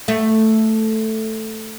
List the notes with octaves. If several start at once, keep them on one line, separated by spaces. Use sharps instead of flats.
A3